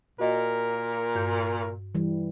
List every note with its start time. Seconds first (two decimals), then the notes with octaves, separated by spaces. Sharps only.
0.20 A#2 F#4 A#4 D#5
1.15 G2 G6
1.95 E3 G3